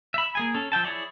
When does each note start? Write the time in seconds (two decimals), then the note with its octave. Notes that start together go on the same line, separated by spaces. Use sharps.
0.14 E5 B5
0.35 A#3 G#4 G#5
0.54 C#4 A4
0.72 F3 E5 G5 A5
0.84 E4 G#4 C#5 D5